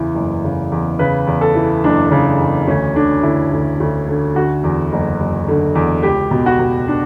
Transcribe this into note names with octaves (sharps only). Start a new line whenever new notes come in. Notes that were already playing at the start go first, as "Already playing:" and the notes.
Already playing: E2 C#3 E3
F#1
C#3
E2
C#3 B4
E2
A4
E3
F#1 D4
C#3
E2
D2 C#4
D3 D4
D3 E4
D2
D2
D3
D3 F#4
E2
F#1
F#1
D3
E2
C#2 G4
B2
F#4
B2
D4